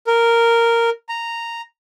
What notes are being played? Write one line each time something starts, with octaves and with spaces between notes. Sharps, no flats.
A#4
A#5